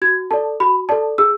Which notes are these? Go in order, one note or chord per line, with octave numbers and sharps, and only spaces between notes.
F#4 G#6
A4 D5 A5
F#4 B5
A4 D5 A5
G#4 E6